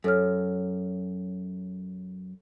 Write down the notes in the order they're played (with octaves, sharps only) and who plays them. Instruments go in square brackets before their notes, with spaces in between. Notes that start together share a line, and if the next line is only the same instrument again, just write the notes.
[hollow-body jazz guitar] F#2 [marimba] A4 C#5 F6